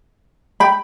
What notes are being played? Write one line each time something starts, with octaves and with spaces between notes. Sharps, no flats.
G5 B5